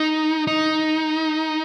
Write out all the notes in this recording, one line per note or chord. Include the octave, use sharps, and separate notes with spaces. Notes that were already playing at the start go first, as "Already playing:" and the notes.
Already playing: D#4
D#4